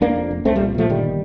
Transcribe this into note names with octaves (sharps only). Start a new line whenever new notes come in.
F1 A#3 D4
F2
F1
C2 A3 C4
G3 A#3
A#2
A#2 F3 A3
G1 D#3 G3